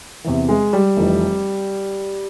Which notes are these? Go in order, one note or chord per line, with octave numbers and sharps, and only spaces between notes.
E2 C3 E3
G#3
G3
F1 F2 E3